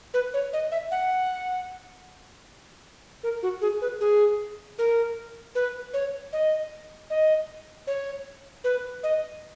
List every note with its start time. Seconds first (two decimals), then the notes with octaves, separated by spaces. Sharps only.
0.14 B4
0.34 C#5
0.53 D#5
0.72 E5
0.91 F#5
3.23 A#4
3.43 F#4
3.62 G#4
3.82 B4
4.01 G#4
4.78 A#4
5.55 B4
5.94 C#5
6.33 D#5
7.10 D#5
7.87 C#5
8.64 B4
9.03 D#5